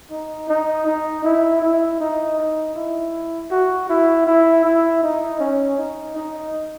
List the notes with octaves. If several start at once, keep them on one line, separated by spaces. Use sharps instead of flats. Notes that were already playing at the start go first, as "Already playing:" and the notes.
D#4
D#4
D#4
E4
E4
D#4
D#4
E4
F#4
E4
E4
E4
D#4
C#4
D#4
D#4